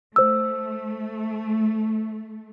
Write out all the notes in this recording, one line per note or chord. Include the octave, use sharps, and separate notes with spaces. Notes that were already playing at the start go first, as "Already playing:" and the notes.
A3 C5 E6